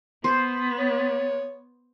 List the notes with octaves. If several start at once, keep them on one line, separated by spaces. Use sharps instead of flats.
B3 C5
C#5